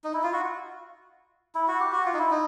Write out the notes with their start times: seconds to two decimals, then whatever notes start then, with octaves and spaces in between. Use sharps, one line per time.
0.04 D#4
0.14 E4
0.23 F4
0.33 F#4
1.55 E4
1.68 F#4
1.80 G4
1.93 F#4
2.06 F4
2.14 D#4
2.19 E4
2.31 D#4